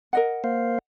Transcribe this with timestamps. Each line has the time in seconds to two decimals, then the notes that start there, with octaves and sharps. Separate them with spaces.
0.13 A#4 D#5 F#5
0.44 A#3 C5 F5